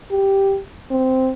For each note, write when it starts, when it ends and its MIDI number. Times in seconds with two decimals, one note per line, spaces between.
0.11 0.59 67
0.91 1.31 60